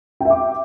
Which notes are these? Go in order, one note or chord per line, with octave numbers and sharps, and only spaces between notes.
E5 G5 D6